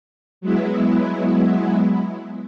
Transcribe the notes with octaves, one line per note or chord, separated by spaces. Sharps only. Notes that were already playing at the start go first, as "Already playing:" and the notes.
F#3 G#3 B3 E4